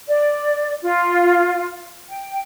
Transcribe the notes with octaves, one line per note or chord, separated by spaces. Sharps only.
D5
F4
G5